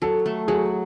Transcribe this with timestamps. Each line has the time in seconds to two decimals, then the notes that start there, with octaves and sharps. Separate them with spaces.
0.02 F#3 A4
0.26 A3
0.48 F#3 G#4